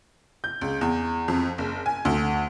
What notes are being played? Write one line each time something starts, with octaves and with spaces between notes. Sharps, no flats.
G6
C#2
E2
F2
F#1
G#5
D2